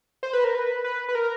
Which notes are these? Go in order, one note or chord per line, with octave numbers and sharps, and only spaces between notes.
C5
B4
A#4
B4
B4
B4
A#4